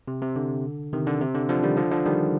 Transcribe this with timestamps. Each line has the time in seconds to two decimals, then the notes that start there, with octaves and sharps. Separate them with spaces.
0.08 C3
0.22 C3
0.36 D3
0.93 C3 D#3
1.07 D3
1.21 C3
1.35 D3
1.49 D3 F3
1.63 D#3 G3
1.77 D3 F3
1.91 D3 F3
2.06 D#3 G3